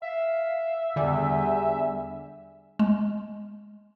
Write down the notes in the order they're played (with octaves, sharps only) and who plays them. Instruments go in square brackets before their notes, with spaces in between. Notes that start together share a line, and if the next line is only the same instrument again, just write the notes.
[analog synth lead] E5 [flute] F5
[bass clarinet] E2 [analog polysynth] D3 G3 [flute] G#5
[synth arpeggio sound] G#3